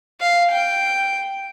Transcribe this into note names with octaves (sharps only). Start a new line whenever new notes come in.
F5
G5